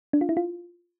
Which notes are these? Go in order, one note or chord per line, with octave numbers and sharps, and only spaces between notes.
D4
F4
E4
F4